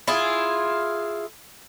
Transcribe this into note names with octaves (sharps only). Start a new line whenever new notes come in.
E4 F4 G#4